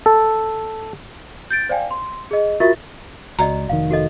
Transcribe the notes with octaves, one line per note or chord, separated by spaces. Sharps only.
A4
G6 A6 D7
C5 D5 F5 G5 G#5
C6
G#4 D#5
F4 F#4 A#4 E5 C#6 A6
C#2 F#4 D5 D#5 A#5
F1 D#3 F5
F#4 A4 D#5